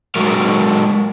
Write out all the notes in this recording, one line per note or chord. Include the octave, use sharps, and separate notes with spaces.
F#3 G#3 F#4 A#4